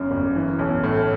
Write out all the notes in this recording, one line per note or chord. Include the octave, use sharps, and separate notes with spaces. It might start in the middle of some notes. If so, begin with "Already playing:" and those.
Already playing: G1 F#2 C#3
G1
E3
B1
A2